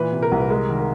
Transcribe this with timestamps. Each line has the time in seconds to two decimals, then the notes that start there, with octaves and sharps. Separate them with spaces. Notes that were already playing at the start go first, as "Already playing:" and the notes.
Already playing: A#2 E3 B4
0.12 C3
0.22 A#4
0.32 C2
0.39 B4
0.50 G#3 A#4
0.69 D#3
0.79 A#4